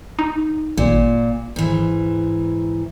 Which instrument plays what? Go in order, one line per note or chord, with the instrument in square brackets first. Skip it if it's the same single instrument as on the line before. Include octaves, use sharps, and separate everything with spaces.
[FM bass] D#4
[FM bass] G#1 [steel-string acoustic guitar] A#2
[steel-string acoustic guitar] G#2 E3